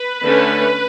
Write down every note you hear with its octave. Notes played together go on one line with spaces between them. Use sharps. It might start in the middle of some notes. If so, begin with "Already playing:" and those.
Already playing: B4
D3 A3 C#4